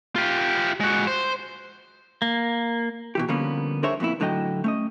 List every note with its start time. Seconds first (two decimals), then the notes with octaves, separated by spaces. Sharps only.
0.16 F4 G4
0.80 G#3 F#4
1.07 C5
2.22 A#3
3.15 B2 E3 G4
3.28 D3 F3 G3 A#3 B3 C#4
3.83 D4 G#4 A#4 C5 C#5 E5
4.00 F2 A#2 B3 E4
4.20 A2 D3 F#3 D#5 G5
4.64 A3 C#4 D#5